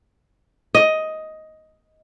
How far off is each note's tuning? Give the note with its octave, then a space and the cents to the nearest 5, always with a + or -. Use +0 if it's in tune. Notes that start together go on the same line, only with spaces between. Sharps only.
D#5 +10